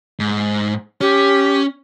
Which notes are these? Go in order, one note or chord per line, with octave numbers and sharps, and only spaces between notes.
G#2
C#4 G4